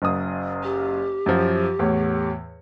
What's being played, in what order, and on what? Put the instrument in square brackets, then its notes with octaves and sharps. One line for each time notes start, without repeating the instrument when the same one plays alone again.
[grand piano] F#1 F#2 D#6
[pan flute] G4
[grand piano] F#2 F3
E2 A2 C#5